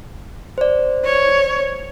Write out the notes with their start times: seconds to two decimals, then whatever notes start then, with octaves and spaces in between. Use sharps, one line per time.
0.58 C5 D5
1.05 C#5